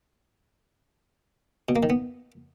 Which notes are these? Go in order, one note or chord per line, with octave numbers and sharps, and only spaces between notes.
B2
A#3
D#3
B3